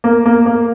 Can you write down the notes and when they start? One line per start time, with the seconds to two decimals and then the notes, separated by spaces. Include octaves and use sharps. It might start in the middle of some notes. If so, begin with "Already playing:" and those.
0.04 A#3
0.26 A#3
0.46 A#3